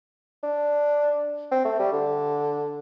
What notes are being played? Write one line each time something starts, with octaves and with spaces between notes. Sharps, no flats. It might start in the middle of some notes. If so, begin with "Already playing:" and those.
D4
C4
A3
G3
D3